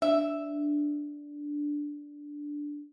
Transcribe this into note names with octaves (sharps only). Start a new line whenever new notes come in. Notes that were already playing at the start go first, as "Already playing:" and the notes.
D4 E5